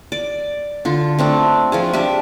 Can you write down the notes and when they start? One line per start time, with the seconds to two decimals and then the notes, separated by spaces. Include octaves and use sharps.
0.12 D5
0.85 D3 F4
1.19 A3 C4 D4
1.72 F3 F4 G#4
1.93 D4 G4 E5